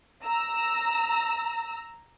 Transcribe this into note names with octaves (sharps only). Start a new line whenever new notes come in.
A#5 E6